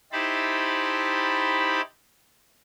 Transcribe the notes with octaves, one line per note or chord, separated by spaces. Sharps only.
D#4 E4 G4 C5 A5 B5